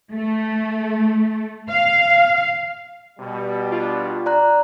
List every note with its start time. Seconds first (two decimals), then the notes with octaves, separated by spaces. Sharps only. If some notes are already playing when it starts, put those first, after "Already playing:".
0.13 A3
1.70 F5
3.20 B2 G3
3.72 D4 F4
4.26 D5 A#5 F#6